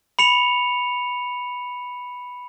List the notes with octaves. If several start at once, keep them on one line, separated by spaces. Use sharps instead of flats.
B5 C#7 F7